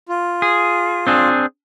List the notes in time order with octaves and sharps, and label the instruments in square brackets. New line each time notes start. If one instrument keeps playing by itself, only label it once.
[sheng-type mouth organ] F4
[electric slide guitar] G#4
C4 D4 G#4